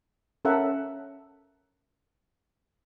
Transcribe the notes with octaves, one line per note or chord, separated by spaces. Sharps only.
C#4 A4 A#4 E5 F#5